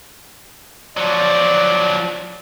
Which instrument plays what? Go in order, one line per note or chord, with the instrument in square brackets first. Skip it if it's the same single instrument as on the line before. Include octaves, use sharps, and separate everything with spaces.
[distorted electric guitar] F3 F#3 [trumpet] D5